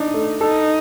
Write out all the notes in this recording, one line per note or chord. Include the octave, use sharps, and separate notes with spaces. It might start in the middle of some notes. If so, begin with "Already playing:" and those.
Already playing: D4 D#4
A3
D#4 A4